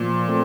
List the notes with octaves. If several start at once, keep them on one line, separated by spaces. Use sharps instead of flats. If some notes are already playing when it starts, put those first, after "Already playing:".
Already playing: A#2 F3
A3 C4